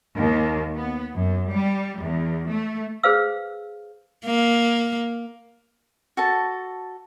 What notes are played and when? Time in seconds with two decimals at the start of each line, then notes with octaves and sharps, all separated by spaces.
0.16 D#2
0.76 B3
1.14 F#2
1.50 G3
2.01 E2
2.49 A3
3.03 G#4 B4 C5 F5 E6
4.25 A#3
6.17 F#4 A4 A5